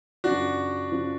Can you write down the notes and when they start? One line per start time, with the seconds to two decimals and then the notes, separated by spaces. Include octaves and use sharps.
0.24 F#2 C#3 F3 D4 F#4
0.92 C#3 F3